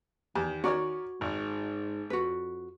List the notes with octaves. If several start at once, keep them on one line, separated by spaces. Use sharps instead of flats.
E2 D#3 G4
C#4 F#4 A#4 C#5 D5
G#1 G#2
F2 F#4 B4